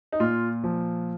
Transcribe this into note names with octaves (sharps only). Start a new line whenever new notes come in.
D#4
A#2 F4
F3